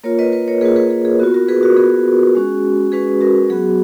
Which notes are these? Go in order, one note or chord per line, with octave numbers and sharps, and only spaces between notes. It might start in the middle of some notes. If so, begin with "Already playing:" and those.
A#3 F4 A#4 C#5
B4 D#5
B4 D#5
A#4 C#5
A#3 F4 G#4 B4
G#4 B4
G#4
G#4
B3 F4 F#4
F#4 A#4
G#4 B4
F#4 A#4
B3 F4 G#4
G#3 C#4 F#4
G#3 C#4 F#4 G#4 B4
F#4 A#4
F#3 B3 F#4 G#4